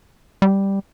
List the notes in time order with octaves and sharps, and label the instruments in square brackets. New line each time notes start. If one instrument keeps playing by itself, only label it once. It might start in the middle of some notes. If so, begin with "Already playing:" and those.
[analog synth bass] G3